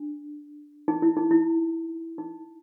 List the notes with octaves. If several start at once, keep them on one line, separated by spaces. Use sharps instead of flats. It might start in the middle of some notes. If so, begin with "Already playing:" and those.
Already playing: D4
D#4
E4
D#4
E4
D#4